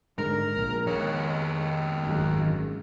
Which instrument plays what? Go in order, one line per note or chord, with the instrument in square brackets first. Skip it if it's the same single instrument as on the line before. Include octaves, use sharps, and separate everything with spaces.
[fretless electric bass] G#2 D3 G#3 [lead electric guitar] A#4
[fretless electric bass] A#1
[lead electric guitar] D#3 C#5 [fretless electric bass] G#3
[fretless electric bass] G#1 F#2 G#3